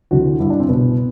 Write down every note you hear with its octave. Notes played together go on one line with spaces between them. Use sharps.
D2 C3 E3 F#4
G2 D3 E4
D4
C4
C2 B2 B3